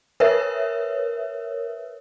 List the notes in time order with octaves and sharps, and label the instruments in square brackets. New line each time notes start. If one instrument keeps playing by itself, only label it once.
[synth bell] A#4 B4 C#5 E5